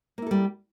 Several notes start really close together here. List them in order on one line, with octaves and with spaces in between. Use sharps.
A#3 E4 A4 G3